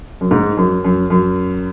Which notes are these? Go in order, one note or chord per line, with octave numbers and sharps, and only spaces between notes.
F#2
G#2
F#2
F#2
F#2